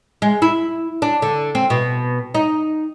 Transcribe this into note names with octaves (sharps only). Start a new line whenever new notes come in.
G#3
E4
D4
D3
C4
B2
D#4